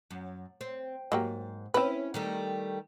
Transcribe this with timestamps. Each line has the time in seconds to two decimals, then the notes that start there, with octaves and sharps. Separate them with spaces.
0.11 F#2
0.61 C4
1.12 G#2 F#3 A#3 G4
1.74 C4 C#4 E4 B4
2.14 D#3 G3 A3